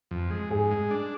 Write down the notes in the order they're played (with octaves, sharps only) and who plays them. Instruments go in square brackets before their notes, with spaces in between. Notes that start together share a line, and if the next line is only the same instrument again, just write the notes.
[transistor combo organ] F2
G#3
[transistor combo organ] G#2 [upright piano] G#4
[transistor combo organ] G#3
D4